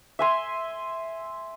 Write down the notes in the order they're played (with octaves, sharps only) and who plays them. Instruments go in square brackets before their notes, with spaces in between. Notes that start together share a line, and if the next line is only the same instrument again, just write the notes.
[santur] E5 G#5 C6